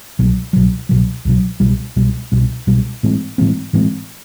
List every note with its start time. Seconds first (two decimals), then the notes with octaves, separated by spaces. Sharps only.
0.19 C2 B2 F#3
0.53 C2 B2 F#3
0.89 C2 B2 F#3
1.25 C2 B2 F#3
1.60 C2 B2 G3
1.96 C2 B2 G3
2.32 C2 B2 G3
2.67 C2 B2 G3
3.03 A2 E3 G#3 C4
3.38 A2 E3 G#3 C4
3.73 A2 E3 G#3 C4